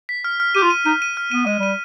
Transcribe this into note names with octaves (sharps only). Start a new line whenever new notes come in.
B6
F6
F6
G4 D#7
F4
D#7
D#4 D#7
D#7
F6
B3 D#7
G#3 D#7
G3 D#7